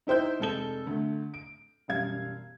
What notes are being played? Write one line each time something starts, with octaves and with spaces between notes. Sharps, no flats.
D#4 E4 C5 G5 G6
F1 G#3 A4 G7
D2 A3
D7
E1 F#2 G3 F5 G#6